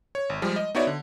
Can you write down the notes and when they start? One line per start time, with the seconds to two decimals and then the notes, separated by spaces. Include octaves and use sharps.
0.15 C#5
0.30 G#1
0.42 F3 G3 G#3
0.56 D#5
0.75 B3 D#4 F#4 C#5 D5 E5
0.87 D3